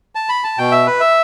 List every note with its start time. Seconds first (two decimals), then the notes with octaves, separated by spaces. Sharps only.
0.15 A5
0.29 B5
0.44 A5
0.58 B2 G5
0.72 E5
0.86 B4
1.00 E5